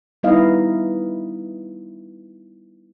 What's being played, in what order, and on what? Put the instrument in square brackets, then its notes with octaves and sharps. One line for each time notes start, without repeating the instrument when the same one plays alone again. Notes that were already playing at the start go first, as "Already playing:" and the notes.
[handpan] G3 B3 D#4 E4 D#5 F5